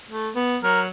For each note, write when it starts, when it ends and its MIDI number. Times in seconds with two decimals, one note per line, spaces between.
0.10 0.29 57
0.35 0.57 59
0.63 0.88 54
0.63 0.80 70